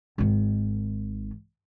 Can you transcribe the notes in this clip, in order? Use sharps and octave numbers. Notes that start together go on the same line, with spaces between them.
G#1 D#3